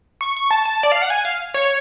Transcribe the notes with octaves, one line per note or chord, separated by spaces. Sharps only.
C#6
C#6
A5
A5
D5
F5
F#5
G#5
F5
C#5